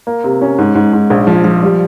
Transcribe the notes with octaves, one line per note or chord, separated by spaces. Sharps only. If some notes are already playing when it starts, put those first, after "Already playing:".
A#3
C3
C#4
G#2
G#2
G#2
A#1
F3
F3
G3